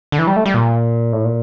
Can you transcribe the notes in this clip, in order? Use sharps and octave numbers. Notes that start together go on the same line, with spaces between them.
D3
E3
G3
A3
G3
A#2
A2
A#2